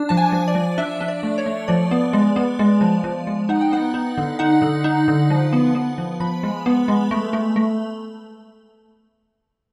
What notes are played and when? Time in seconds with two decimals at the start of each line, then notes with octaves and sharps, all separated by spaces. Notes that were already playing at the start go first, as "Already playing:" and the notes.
Already playing: D4
0.09 F3 A5
0.17 G#5
0.32 F3
0.48 D5
0.55 F3
0.78 D4 E5
1.01 D4
1.08 D5
1.23 A3
1.38 C#5
1.46 A3
1.68 F3 D5
1.91 B3
2.13 G#3
2.36 B3
2.59 G#3
2.81 F3
3.04 F3
3.27 G#3
3.49 D#4 F#5
3.61 G5
3.72 B3 F#5
3.94 D#4
4.18 D3
4.39 D#4 F#5
4.62 D3
4.84 D#4
5.08 D3
5.30 F3
5.53 B3
5.75 B3
5.98 F3
6.20 F3 B5
6.43 G#3
6.66 B3
6.88 G#3
7.11 A3
7.33 A3
7.56 A3